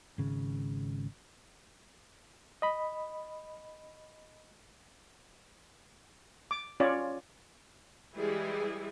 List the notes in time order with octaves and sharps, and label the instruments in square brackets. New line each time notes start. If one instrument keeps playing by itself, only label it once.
[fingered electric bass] G#1 C#3
[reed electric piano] D#5 B5
[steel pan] D6
C#4 F4 C#5 D5
[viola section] E3 G3 G#3 E4 G4 G#4